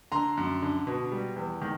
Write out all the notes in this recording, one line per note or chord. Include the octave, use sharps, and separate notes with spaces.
D3 A#5 C6
F#2
D3
B2
G3
E2
D#3